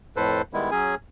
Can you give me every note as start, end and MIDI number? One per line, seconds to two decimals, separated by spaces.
0.16 0.42 41
0.16 0.42 45
0.16 0.42 69
0.16 0.42 71
0.16 0.42 72
0.53 0.70 51
0.53 0.70 55
0.53 0.70 56
0.53 0.70 59
0.53 0.70 64
0.71 0.95 54
0.71 0.95 61
0.71 0.95 68
0.71 0.95 80